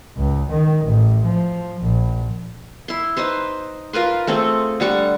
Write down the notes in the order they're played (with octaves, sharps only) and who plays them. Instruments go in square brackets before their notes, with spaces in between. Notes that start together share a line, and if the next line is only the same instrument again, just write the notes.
[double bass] C#2
D#3
A1
F3
A#1
[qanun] E4 C6
D#4 B4 C5 C6
F4 A#4 B4 C6
A3 C4 G#4 A4
D3 G3 F#5 C#6